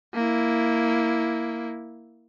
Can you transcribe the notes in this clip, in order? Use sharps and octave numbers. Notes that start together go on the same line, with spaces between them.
A#3 E4